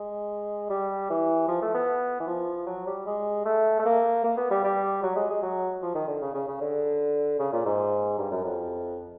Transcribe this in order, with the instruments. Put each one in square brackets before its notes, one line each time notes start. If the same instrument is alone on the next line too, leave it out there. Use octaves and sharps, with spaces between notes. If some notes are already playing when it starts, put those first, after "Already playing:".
Already playing: [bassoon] G#3
G3
E3
F3
A3
B3
E3
F3
F#3
G3
G#3
A3
A3
A#3
A#3
B3
G3
G3
F#3
G#3
G#3
F#3
F3
D#3
D3
C#3
C#3
C#3
D3
C#3
A#2
G#2
G2
F#2
F2